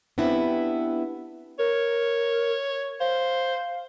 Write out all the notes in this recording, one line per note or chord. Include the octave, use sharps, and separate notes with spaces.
B3 C4 D4 E4 G4 B4
A#4 C#5
C5 F5